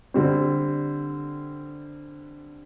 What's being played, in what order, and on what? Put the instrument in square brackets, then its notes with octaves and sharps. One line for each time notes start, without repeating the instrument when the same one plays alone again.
[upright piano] D3 G3 C4